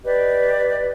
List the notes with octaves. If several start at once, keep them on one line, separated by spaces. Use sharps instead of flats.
G4 B4 D5 D#5